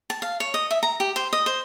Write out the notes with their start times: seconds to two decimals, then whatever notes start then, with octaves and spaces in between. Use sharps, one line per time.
0.10 A5
0.22 F5
0.40 C#5
0.54 D#5
0.71 E5
0.83 A#5
1.00 G4
1.16 C5
1.33 D#5
1.46 C5